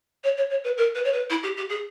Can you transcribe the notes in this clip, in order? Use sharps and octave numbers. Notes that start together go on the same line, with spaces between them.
C#5
C#5
C#5
B4
A#4
B4
C#5
B4
E4
G4
G4
G#4